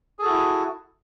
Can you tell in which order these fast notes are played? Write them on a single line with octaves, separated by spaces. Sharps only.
G#4 A4 F#4 E4